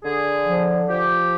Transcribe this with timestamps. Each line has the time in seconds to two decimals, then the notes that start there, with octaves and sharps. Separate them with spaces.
0.03 D3 G#4
0.46 F3
0.89 F3 G4